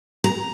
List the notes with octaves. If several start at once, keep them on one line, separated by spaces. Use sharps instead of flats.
A#5